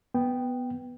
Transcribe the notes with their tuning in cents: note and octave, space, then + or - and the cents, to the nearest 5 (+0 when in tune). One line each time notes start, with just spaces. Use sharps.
B3 +5 G5 +0